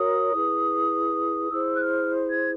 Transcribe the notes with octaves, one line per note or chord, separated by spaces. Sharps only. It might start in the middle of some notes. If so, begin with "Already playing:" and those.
Already playing: F#4 A#4 C#5 D#6
E4 G#4 B4
E4 G#4 C5 E6
F#6
F6
G#6